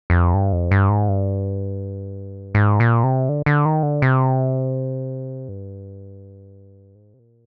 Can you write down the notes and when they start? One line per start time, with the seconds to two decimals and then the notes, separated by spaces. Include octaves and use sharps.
0.10 F2
0.34 G2
0.53 F2
0.71 G2
0.90 G#2
1.09 G2
2.55 G#2
2.80 A#2
3.04 C3
3.29 D3
3.46 D3
3.65 D#3
3.83 D3
4.02 C3
5.48 G2
6.95 G#2
7.14 C3
7.19 A#2